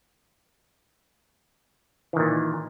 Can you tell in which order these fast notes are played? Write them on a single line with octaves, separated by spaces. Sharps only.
E3 D#3 A#2